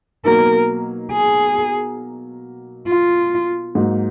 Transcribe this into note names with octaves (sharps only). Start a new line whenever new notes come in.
B2 F#3 A#3 D#4 A#4
G#4
F4
G#2 F#3 A#3